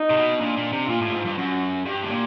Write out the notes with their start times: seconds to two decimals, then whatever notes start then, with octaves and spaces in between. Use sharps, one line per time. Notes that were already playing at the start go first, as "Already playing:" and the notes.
Already playing: D#4
0.10 C3
0.17 B2
0.41 A#2 D4
0.57 A#2
0.73 C3
0.89 A#2 F4
1.02 A2
1.08 G2
1.14 G#2
1.25 G2
1.38 F#2 F#4
1.86 G2 G4
2.03 A2
2.11 A#2